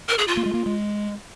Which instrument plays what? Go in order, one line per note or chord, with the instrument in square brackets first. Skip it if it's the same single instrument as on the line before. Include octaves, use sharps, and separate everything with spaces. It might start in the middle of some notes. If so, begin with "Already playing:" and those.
[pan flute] A#4
G#4
F4
[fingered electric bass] A#3
G#3
A#3
G#3